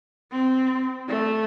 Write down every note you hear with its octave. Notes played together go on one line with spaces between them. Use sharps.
C4
A3